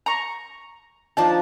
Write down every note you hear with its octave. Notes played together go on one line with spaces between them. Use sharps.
A#5 C#6
F3 D4 D#4 A5